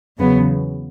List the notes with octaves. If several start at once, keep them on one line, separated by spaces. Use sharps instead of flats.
E2 C#3 F#3 B3